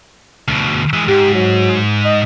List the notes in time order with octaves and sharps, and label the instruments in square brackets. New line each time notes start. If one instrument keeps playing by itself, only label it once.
[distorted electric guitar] D2 B2
E3 G#3
[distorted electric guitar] G#2 [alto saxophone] G4
[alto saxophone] F#3
D#5